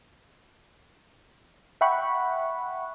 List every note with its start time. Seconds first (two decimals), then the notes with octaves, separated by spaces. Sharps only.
1.81 E5 F#5 G5 B5 C#6 F#6